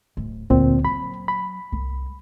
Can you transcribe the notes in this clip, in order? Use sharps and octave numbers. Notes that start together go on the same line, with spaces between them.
D1
D2 A#2 C4
F#3 B5
B5
C2